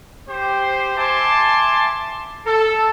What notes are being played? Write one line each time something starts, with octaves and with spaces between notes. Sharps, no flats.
G4 C5
E5 G#5 A5 C6 D6
A4